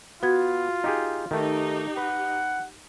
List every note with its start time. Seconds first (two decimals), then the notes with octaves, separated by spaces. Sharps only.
0.23 B3 F4 F#4 G#6
0.84 D#4 G4 G#4
1.31 D#3 A3 D#4 G4
1.97 B4 F#5